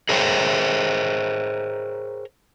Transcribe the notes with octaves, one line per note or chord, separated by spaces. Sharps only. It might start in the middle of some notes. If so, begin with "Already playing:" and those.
G#4 A#4 C5 C#5 G5